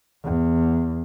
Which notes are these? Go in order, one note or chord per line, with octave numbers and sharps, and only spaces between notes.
E2